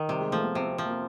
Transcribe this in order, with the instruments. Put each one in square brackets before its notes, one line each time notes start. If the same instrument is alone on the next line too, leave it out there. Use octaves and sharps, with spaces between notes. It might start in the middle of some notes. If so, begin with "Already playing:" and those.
Already playing: [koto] D#3
[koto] C3 [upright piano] G3
[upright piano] G#3
[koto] F3 [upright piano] A3
[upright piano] B3
[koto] C3 [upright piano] C4
[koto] F3
[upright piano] A#3